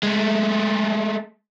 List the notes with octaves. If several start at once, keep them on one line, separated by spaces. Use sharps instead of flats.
G#3 A3